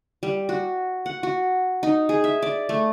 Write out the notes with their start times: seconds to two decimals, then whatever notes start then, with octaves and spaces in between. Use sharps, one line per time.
0.23 G3
0.49 F#4
1.06 F#5
1.23 F#4
1.83 D#4
2.09 G#4
2.24 E5
2.42 D5
2.69 A3